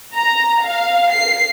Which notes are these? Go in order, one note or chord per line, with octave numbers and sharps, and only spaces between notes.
A#5
F5
C7